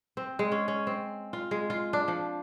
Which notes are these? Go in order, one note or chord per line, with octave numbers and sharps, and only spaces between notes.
C4
G#3
C#4
C#4
C4
F4
G#3
F4
D4
F3